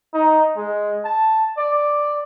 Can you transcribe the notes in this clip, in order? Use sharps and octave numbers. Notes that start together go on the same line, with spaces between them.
D#4
G#3
A5
D5